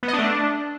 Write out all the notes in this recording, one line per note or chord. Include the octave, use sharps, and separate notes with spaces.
B3
D#5
D4
A3
D4